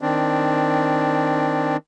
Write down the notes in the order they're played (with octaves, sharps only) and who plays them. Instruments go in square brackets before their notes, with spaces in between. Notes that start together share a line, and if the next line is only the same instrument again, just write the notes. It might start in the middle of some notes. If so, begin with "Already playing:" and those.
[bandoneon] D#3 C4 D4